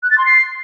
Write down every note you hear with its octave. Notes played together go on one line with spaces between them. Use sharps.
F#6
A6
C6
C7